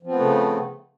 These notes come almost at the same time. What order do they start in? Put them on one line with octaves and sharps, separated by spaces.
F3 C4 B3 A3 C#3